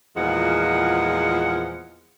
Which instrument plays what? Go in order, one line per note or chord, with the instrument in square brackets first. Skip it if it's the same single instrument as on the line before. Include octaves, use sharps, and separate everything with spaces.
[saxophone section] E2 A#2 F3 G#3 F#4 F#5